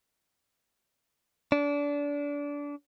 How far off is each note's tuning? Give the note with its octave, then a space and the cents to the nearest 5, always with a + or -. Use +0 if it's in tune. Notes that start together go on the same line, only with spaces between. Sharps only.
D4 -25